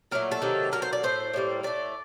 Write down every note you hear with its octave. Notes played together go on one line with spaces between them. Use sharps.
A#2 F#3 A3 A#4
A4
C3 D#3 F#3 A#3
D3 F#3 A#3 A#4
C5
D5
A2 A3 C5
A2 G3 A#3
A2 A3 D5